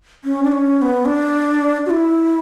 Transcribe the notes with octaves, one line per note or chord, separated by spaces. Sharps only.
C#4
D4
C#4
C#4
B3
D4
F#4
E4